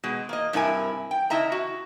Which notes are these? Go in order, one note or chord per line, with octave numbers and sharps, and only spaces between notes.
B2 G#3
A#3 D#5
G2 C3 E4 A#4 G#5
G5
C#3 E4 D#5 E5 A#5
F#4